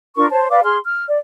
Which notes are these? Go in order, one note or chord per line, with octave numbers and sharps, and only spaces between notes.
D4 F4 A#4 C#6
C5 C#5 A5
B4 D5 F5 D6
G#4 C6 F6
F6
D5